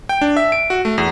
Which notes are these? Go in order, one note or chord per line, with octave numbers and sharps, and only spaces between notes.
G5
D4
E5
D7
F#4
A3
E2